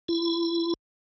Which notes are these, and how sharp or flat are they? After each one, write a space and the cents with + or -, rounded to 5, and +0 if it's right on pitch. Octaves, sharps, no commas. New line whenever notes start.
E4 +35